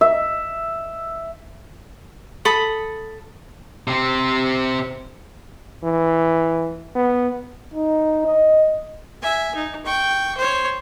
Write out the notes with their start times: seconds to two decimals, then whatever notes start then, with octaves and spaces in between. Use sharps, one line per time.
0.01 E5
2.45 A4 B5 D#6
3.87 C3 C4
5.83 E3
6.95 B3
7.74 D#4
8.26 D#5
9.22 E5 G#5
9.55 D#4
9.86 G5 C#6
10.37 C5 C#5